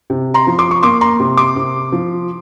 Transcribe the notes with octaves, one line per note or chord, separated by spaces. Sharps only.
C3
A#5 C6
F3
C6 D6
C#6
A#3 C6 D6
A#5 C6
C3
C6 D6
C3
F3